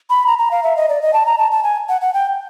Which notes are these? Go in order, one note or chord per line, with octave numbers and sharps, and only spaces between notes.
B5
A#5
A#5
F5
E5
D#5
D5
D#5
A5
A#5
A5
A5
G#5
F#5
F#5
G5